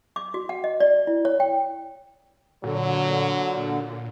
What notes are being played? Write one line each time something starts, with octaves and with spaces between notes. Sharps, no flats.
D6
F#4
F#5
D#5
D5
E4
C#5
G5
A#2 D3 F#3